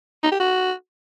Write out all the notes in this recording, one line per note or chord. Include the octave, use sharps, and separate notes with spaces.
D#4
G4
F#4